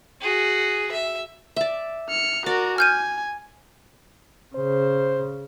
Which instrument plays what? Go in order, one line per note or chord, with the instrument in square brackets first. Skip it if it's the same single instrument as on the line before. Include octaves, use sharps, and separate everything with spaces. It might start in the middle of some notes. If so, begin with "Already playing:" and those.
[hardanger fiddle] F#4 G#4
E5
[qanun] D5 E5
[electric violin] F6 C#7
[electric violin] F#4 A#4 [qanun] D5
[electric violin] G#5 [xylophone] F6 G6 D#7
[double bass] C#3 [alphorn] C5